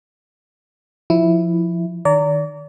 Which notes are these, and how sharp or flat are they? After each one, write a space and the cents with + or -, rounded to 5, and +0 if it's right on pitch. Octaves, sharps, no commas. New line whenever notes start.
F3 +0 E4 +0
D#3 -15 D5 -35 A#5 -25